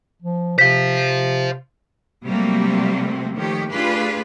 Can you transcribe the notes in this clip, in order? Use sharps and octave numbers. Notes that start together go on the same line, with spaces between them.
F3
C3 C5 F5 B6
C3 F#3 G3 A3 A#3 C4
D#3 F3 A3 G4 C#5
A3 D4 F4 G4 G#4 B4